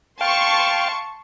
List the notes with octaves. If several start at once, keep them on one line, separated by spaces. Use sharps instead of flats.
F5 G5 A5 C6 C#6